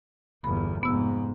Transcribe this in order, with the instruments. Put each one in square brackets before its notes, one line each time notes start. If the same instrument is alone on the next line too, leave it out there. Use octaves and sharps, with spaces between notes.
[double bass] G1 E2 [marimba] B5
[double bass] F1 G#2 [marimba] B3 E6